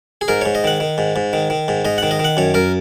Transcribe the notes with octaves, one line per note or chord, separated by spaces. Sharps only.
G#4
G#2 A#4
G#2 C#5
D#5
D#3 F#5
D#3
G#2
G#2
D#3
D#3
G#2
G#2 D#5
D#3 F#5
D#5
D#3
F#5
F#2 C#5
F#2 A#4